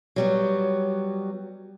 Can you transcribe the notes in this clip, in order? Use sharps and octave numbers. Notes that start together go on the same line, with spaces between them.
F#3 G3 B3